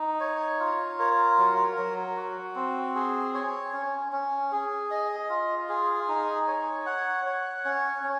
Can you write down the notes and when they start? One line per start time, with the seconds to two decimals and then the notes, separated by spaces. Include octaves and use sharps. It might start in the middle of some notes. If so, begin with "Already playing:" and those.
Already playing: D#4
0.20 C#5
0.60 F4
0.99 A#4
1.38 F#3
1.78 F#3
2.16 F#4
2.55 C4
2.95 G#4
3.34 C#5
3.73 C#4
4.12 C#4
4.52 G#4
4.91 D#5
5.30 F4
5.69 G#4
6.08 D#4
6.48 C#5
6.86 F#5
7.26 C#5
7.65 C#4
8.04 C#4